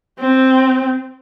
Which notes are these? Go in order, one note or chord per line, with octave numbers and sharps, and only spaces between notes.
C4